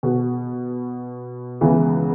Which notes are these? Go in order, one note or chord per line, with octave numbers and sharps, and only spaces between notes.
B2 B3 F#4
C#2 C#3 E3 B3